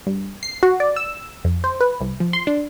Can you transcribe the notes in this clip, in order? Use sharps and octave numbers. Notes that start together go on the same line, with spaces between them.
G2
C7
F#4
D5
E6
F2
C5
B4
C2
F3
C6
D4